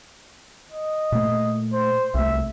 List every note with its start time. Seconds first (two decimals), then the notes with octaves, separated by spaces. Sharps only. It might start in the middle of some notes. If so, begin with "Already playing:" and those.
0.72 D#5
1.12 A#2 A3
1.73 C5
2.15 C2 A3 E5